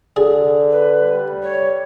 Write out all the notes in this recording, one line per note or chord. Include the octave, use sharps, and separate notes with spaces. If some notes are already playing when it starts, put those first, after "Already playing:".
D3 G#4
B4
G3
C#5